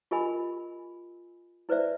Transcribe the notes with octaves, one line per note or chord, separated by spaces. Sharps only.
F4 G4 A#4 D#5 G#5 B5
E4 B4 C5 D5 E5